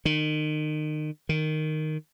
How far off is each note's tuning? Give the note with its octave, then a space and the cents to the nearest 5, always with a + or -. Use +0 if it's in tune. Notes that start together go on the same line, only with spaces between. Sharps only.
D#3 -30
D#3 -5